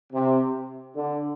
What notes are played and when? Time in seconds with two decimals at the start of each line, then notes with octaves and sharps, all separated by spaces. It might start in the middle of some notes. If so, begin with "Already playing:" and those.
0.13 C3
0.95 D3